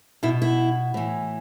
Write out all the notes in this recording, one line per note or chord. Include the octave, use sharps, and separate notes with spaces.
B2 E4
E4
A2 E3